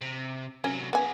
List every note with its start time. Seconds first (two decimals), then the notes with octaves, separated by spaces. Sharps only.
0.01 C3
0.64 C3 F#3 C#4
0.93 B3 F#4 G#4 G#5